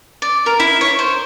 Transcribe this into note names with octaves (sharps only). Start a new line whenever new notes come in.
D5
A#4
E4
C#5
C5